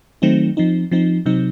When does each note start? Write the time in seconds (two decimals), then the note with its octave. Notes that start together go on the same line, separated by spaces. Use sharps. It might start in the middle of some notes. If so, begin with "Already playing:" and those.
0.22 D#3 F#3 A3 C4 D#4
0.57 F3 C4 D#4
0.91 F3 C4 D#4
1.26 C3 F#3 C4 D#4